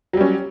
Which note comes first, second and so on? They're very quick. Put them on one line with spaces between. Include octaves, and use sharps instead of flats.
F#3 G3 C#4